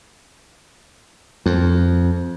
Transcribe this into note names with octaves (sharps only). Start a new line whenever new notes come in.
F2